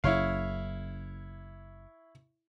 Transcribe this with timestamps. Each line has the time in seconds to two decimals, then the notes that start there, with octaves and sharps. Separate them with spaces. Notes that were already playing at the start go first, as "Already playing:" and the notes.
0.04 F#1 C#3 E4 C#5 F5